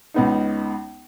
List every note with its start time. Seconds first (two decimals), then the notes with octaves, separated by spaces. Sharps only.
0.14 C#2 B3 D#4